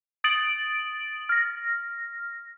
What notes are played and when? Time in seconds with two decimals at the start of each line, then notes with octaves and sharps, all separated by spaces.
0.24 D#6 A6 D7 F#7
1.29 F6 A#6